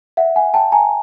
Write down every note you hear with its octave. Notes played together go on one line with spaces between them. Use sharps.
E5 F#5
F#5 G#5
G5 A5
G#5 A#5